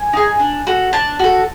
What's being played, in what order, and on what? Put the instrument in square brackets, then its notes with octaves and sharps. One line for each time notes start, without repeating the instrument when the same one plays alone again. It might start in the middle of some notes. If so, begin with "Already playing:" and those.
Already playing: [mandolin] G#5
D#4 G#4
D4
F#4 A4
D4 A5
F#4 A4